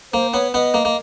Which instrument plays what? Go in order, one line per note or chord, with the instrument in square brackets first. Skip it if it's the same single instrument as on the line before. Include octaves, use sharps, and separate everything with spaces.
[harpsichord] A#3 [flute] C5
[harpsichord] B3 [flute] C#5
[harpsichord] B3 [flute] D#5
[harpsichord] A#3
A#3